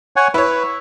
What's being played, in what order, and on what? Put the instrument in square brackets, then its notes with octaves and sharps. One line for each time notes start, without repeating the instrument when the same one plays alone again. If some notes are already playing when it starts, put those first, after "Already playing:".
[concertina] C#5 F#5 G#5
[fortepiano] E4 C#5 [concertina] B4